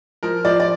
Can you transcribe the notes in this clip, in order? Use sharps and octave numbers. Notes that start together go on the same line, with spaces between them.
F3 A#4
F3 D5
D5